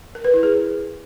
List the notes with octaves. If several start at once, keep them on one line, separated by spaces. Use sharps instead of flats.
A#4
B4
E4
G#4